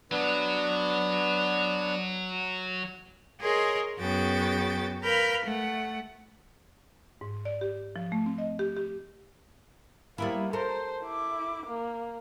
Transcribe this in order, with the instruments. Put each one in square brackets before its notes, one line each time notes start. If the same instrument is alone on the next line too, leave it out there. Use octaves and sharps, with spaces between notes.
[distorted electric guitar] F#3 [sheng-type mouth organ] B3 D4 B4
[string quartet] G#4 A#4 C#5 D#5 C6
F#2 B3 F#4 G#4 G5 A6
A#4 B4 F5 B5 F6 G6
A3 F#5
[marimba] G#2
D5
G4
F3
A3
C4
D#5
G4
G4
[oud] G3 B3 E4 [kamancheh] A#3
[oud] A4 A#4 [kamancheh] C5
[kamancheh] E4 D6
A#3